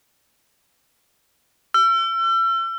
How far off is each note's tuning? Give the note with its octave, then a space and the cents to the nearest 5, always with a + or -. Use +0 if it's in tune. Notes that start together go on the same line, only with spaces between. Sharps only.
E6 +40